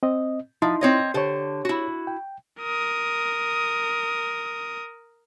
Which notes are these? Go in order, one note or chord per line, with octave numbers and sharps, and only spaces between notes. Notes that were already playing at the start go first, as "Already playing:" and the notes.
C4 D#5
F3 D#4 E4 C6
C4 C#5 D#5
D3 G4 C5 C#5
E4 F#4
G5
A#4 D#6